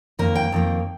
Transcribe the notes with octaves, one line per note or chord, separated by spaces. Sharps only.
F2 D#3 A#3 A#4
G5
F2 D#3 A#3